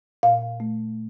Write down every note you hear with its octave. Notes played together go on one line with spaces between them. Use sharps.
A#2 F5
A3